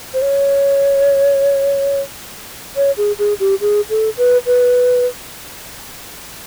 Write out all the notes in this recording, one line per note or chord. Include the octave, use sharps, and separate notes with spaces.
C5
C#5
C#5
G#4
G#4
G4
G#4
A4
B4
B4